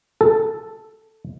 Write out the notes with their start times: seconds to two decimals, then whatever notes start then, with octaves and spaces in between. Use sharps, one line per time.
0.21 A4